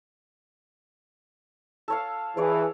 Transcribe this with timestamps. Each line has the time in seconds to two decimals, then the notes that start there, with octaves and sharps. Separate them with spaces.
1.88 A4 C#5 F5
2.37 E3 G#4 C#5 D5